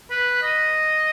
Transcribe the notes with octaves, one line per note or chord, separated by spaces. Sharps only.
B4
D#5